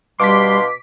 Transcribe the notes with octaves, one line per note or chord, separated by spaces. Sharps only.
B2 G3 D4 F5 C6 D6 B6